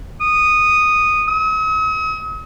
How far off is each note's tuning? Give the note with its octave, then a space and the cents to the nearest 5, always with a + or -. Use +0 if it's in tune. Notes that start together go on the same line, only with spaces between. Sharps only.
D#6 -10
D#6 +45